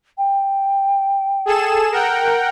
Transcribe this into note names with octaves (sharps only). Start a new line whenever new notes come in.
G5
G#4 A4 E7
A#4 F#5 G5